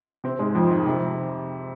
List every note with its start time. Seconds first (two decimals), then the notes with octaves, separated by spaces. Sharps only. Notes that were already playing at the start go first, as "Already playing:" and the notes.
0.24 C3 C4
0.39 G#2 G#3
0.55 F2 F3
0.71 D#3
0.86 C3